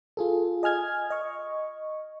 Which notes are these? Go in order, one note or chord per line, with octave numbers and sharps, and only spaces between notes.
F4 G#4 A4
D#5 G#5 F6 G#6
D#5 C#6